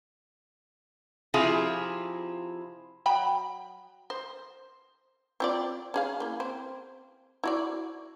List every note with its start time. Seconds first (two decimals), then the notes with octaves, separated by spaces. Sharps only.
1.34 C3 F3 E4 F4 G#4
3.06 F#3 G5 B5
4.10 C5
5.40 C4 F4 D5
5.94 C#4 G#4 F5
6.20 A#3 E4
6.40 C4
7.44 E4 F#4 D5